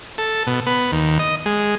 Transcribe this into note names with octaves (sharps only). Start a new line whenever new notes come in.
A4
B2
B3
D#2
D#5
G#3